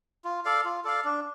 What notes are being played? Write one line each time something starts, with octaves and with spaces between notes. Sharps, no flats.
F4
A4 D5 F5
F4
A4 D5 F5
D4